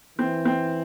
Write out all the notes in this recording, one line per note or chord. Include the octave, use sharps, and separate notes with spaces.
E3 C4
C4